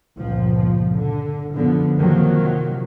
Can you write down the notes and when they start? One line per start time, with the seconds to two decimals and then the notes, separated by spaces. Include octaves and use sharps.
0.18 G1 C#2 A#2 F3
0.95 D3
1.55 F#2 D3 F3 B3
1.97 C3 D#3 F3 F#3 A#3